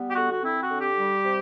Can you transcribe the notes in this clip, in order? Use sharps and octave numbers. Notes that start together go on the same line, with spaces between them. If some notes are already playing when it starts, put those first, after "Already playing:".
Already playing: G3 B3
G4
D3 F#4
F#4
C4 E4
F#4
D3
G4
G3
C3